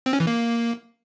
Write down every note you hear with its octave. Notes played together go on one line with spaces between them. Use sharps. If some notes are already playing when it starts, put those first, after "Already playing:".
C4
C#4
E3
A#3